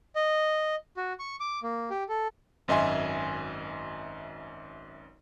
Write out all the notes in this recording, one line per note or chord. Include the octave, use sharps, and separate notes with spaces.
D#5
F#4
C#6
D6
A#3
G4
A4
G#1 F#2 D#5 E5 G#5 C6